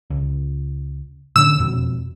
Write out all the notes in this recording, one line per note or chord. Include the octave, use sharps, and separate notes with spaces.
C#2
A2 D3 C#4 E6
E1 F2 B2